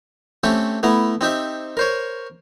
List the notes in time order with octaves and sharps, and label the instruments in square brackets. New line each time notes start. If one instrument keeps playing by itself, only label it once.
[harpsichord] A3 C4 C#4 G4 A4
A3 B3 E4 A#5
C4 D#4 G4 E5
A#4 C5 C#5